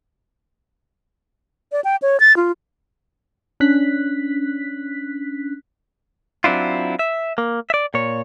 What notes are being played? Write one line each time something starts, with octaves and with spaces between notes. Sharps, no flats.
D5
G5
C#5
A6
F4
C#4 D4 F#6 B6
F#3 C4 D4 E4 F4
E5
A#3
D5 E5
A#2 C#5